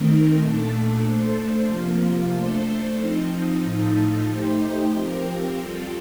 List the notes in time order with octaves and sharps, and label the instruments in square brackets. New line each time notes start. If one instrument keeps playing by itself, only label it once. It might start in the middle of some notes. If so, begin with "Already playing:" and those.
Already playing: [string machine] D#3 A3 C4 D#4 A#4
A#2 A3 D4 A4
A3 D4 A4 C5
C3 F3 A#3 F4
A3 D4 A4 C5
F3 C4 D#4
A2 F3 A3 D#4 A4
A3 D#4 G4 C5
F3 C4 G4 A#4
G3 C4 F4 A4